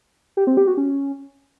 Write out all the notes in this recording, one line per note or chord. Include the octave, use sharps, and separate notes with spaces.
G4
C4
G4
F#4
C#4